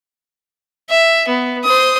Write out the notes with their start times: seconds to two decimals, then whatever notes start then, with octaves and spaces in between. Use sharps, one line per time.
0.90 E5
1.28 B3
1.64 C5 D#6